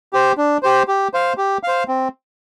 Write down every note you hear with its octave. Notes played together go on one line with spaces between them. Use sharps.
G4 C5
D4
G4 C5
G4
C5 F5
G4
C5 F5
C4